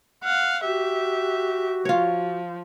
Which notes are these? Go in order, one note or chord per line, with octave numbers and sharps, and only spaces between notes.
F5 F#5
F#4 G4 E5
F3 F4 C#5